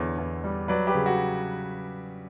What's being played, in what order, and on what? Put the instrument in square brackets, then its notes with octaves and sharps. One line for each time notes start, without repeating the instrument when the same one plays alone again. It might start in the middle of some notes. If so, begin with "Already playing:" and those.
Already playing: [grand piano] E2 D3 B3 C#5
E2
G3
F#3 B4 D5
G4 B4
C#3
F#4